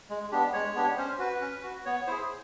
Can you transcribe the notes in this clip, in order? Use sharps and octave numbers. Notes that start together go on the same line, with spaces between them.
G#3
B3 D4 G4
G#3 C#5
B3 D4 G4
C#4 C5
F#4 B4
C#4
F#4
B3 C#5
E4 G#4 C5